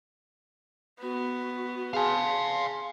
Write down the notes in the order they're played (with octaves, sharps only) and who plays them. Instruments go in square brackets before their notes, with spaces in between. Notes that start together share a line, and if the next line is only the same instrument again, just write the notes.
[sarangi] B3 [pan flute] F#4
[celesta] G#4 A5 [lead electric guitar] F5 G#5 [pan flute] C6